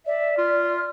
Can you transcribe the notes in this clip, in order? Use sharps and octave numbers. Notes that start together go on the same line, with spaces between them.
D5 E5
F4 F6